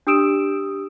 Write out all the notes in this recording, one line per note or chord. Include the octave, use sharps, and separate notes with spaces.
D4 G4 D#6 E6 D7 E7